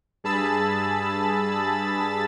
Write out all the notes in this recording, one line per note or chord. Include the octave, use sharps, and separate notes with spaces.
G2 G#4 A5 B5 E6 A6